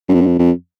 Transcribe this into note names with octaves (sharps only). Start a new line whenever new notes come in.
F#2
F2
F#2
F2
F2